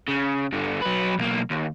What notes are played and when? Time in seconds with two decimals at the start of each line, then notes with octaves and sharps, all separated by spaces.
0.08 C#3
0.52 G2 D3
0.82 F#3 B4
1.19 B1 A#3
1.50 D#2